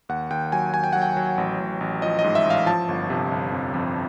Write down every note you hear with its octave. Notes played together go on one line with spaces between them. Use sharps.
D#2 F#5
D#2 G5
F#3 G#5
D#2 G#5
G5
F#3 F#5
G5
F#3
A1
A1
A1
F3 D#5
D#5
G#2
E5
A1 F5
F3 A5
G1
C3
G1
F2
F2